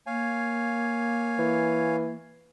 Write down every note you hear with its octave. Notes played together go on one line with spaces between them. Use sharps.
A#3 C#5 F5 G#5
E3